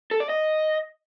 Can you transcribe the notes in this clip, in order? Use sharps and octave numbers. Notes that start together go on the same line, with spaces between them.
A4
D5
D#5